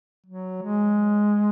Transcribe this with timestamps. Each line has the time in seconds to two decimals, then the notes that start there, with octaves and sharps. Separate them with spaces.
0.26 F#3
0.62 G#3